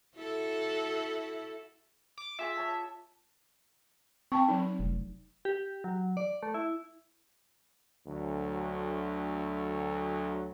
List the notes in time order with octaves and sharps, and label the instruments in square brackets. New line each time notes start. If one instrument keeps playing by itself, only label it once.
[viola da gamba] E4 F#4 A4
[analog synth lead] D6
[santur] F4 G#4 D6 [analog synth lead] E5
[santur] C#5 A5
[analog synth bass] C4 [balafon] G5 A5 C#6
[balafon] F#3 D#4
[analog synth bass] F1
[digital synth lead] G4
F#3
D5
A3
E4
[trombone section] D2 F#3